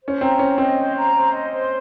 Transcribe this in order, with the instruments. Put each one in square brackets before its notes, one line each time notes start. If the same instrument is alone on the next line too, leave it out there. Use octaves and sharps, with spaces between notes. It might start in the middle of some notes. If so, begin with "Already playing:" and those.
[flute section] C5
[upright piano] C#4
[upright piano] C4 [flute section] A#5
[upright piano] C#4 [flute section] C5
[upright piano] C4 [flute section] D#5
[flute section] C5
A#5
C5
D#5
C5